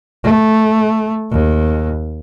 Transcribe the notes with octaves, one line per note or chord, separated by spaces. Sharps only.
A3
D#2